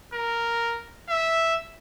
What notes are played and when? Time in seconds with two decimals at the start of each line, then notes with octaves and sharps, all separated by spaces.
0.14 A#4
1.09 E5